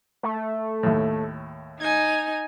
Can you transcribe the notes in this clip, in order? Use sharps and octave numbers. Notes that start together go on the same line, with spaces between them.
A3
D#2 A2
D#4 G#5 G#6